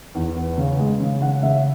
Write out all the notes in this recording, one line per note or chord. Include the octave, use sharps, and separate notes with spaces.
E2
B3
C#3
G#3
C#3
C#3 F#5
C#3 E5